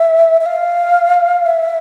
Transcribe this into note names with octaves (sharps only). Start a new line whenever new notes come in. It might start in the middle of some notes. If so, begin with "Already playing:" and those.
Already playing: E5
E5
F5
E5